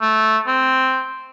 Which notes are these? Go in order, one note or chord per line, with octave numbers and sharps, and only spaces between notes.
A3
C4